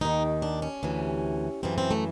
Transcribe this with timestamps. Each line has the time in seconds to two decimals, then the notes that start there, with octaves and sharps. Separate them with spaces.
0.01 D#2 D#3 D#4
0.42 D4
0.62 C#4
0.83 D2 C3 E3
1.63 F#2 C#3 E3 C4
1.78 C4
1.91 A3